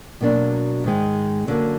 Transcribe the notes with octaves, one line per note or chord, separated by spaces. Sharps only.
B2 F#3 A#3 D4
G#2 D#3 G#3
F#2 D3 F#3 A#3